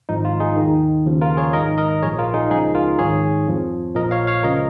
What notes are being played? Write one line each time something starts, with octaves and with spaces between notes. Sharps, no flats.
G#1 G#2 F3 D#4
F4
D#4 G#4
D#3
D#2
D#2 C#3 F3
F4 A#4
G#4 C#5
G#1 G#2 D#3 A#4 D#5
A#4 D#5
A#1 A#2 F3 G#4 C#5
F4 A#4
D#4 G#4
C#2 C#3 F3 D#4 G#4
F4 A#4
G#1 G#2 D#3 G#4 C#5
F2 F3
A#1 A#2 F3 A#4 D#5
C#5 F5
C#5 F5
C#2 C#3 F3 A#4 D#5